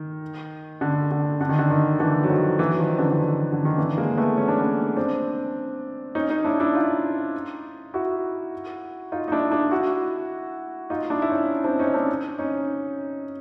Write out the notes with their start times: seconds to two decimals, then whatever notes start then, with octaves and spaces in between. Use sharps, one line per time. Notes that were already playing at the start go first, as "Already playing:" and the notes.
Already playing: D#3
0.81 D3
1.11 D3
1.41 D3
1.49 D#3
1.58 D3
1.70 D#3
2.00 D3 E3
2.23 F#3
2.30 D#3 F3
2.59 E3 F#3
2.79 D#3 F3
2.98 D3 E3
3.10 D3
3.19 D#3
3.52 D3
3.65 D#3
3.78 D3 E3
3.98 G#3 A#3
4.17 A3 B3
4.37 C#4
4.48 D4
4.59 B3 C#4
4.97 C4 D4
6.15 C#4 D#4
6.30 C#4 D#4
6.45 D4 E4
6.60 D4 E4
6.75 D#4 F4
7.94 E4 F#4
9.12 D#4 F4
9.28 D#4
9.32 D4 E4
9.52 D4 E4
9.71 E4 F#4
10.90 D#4 F4
11.10 D4 E4
11.22 E4
11.30 C#4 D#4
11.64 C4 D4
11.79 C#4 D#4
11.94 C4 D4
12.39 C#4 D#4